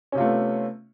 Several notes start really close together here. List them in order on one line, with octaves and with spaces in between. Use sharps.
C#4 C3 F4 A3 B3